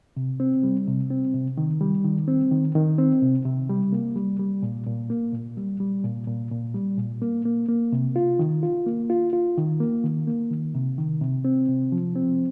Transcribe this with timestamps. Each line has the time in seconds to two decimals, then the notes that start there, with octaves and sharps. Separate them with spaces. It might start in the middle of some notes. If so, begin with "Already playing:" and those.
0.17 C3
0.40 C4
0.63 G3
0.87 C3
1.10 C4
1.34 C3
1.58 D#3
1.81 G3
2.04 D#3
2.28 C4
2.52 D#3
2.75 D#3
2.98 C4
3.22 C3
3.45 C3
3.70 G3
3.92 A#3
4.16 G3
4.39 G3
4.63 A#2
4.87 A#2
5.10 A#3
5.33 A#2
5.57 G3
5.80 G3
6.04 A#2
6.27 A#2
6.51 A#2
6.74 G3
6.98 A#2
7.22 A#3
7.45 A#3
7.69 A#3
7.92 C3
8.16 F4
8.39 D#3
8.63 F4
8.86 A#3
9.10 F4
9.33 F4
9.57 D#3
9.80 A#3
10.04 D#3
10.27 A#3
10.51 D#3
10.75 C3
10.98 D#3
11.22 C3
11.45 C4
11.69 C3
11.92 F3
12.15 C4